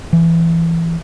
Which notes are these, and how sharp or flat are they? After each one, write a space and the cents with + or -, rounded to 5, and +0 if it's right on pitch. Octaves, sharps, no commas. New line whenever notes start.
E3 +15